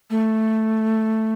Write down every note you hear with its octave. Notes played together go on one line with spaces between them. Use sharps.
A3